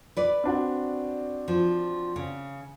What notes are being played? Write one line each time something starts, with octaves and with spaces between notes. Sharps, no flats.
B4 D5
C4 D4 F#4
F3
C#3